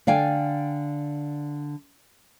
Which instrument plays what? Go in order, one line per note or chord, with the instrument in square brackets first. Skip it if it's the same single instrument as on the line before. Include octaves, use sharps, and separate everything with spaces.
[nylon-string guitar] D3 D5 F5 G5 G#5